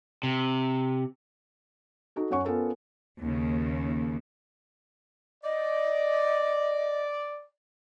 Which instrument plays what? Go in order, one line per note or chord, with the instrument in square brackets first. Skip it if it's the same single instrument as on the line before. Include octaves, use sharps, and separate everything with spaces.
[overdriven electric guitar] C3
[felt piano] D#4 F#4 A4
F#2 C#4 C#5 F#5 C#6
B3 C#4 F4 A4 A#4
[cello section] D#2 C#3
[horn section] D5 [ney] D#5